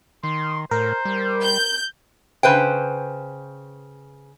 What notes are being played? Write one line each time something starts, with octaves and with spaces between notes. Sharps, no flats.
D#3 C6
A2 A#4 C5
G3
G6
C#3 B4 C5 G5